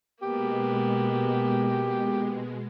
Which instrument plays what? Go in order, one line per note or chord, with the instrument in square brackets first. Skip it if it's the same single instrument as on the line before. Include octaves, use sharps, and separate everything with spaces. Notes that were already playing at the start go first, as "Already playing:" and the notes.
[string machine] B2 G#3 [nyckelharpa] A#3 B3 [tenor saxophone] G4